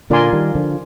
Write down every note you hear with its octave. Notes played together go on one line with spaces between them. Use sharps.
A#2 D3 F4 A#4 D5 G#5 C6
D#3 G3
D3 F3